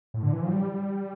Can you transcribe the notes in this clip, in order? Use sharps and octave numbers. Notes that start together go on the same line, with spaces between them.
A2
D3
E3
F3
F#3
G3